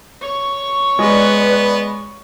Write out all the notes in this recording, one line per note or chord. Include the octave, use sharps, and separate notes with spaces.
C#5 C#6
G#3 B3 B4 D5